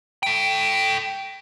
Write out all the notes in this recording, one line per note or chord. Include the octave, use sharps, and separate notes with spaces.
A4 G5